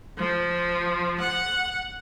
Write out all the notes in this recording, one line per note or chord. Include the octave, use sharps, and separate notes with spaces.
F3
F#5